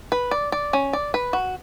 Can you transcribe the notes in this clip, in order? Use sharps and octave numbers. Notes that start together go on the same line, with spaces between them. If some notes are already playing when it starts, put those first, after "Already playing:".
B4
D5
D5
C#4
D5
B4
F#4